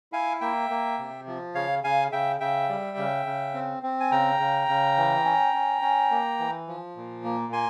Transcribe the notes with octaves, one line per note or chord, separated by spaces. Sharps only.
E4 F5 G#5
A#3 E5 G5
A#3
C3
F3
C#3 C#5 F5
C#3 F5 G#5
C#3 E5 G5
C#3 E5 G5
G3
C#3
C#3
C4
C4
G#5
C#3 G5 A#5
C#3
C#3
E3
C#4
C#4
C#4
A#3
E3
F3
A#2
A#3
A#3 G#5 C6